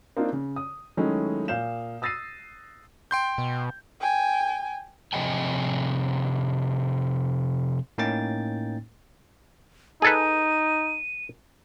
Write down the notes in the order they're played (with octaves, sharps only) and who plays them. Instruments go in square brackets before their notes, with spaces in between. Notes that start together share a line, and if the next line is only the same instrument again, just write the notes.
[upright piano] A#3 C4 D4 D#4 F4
C#3
D#6
D#3 F#3 G#3 A3 C#4 E4
A#2 F5 G6 E7
D#6 E6 A6 A#6 C7 D#7
[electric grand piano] G5 C6 G6
[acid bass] B2
[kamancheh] G5 G#5
[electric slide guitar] C3 F3 G#4 D#5 G5 G#5
[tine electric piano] A2 A#3 C#4 D#4 G5 A6
[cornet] D#4 [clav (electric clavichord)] G#4 A4 B4 [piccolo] D#7